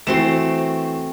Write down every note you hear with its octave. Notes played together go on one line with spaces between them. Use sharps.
E3 A3 C4 F#4 C6 E7